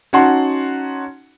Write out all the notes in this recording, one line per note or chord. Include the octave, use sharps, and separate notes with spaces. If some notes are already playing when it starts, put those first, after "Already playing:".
C#4 D#4 F#4 F#5 A5 C6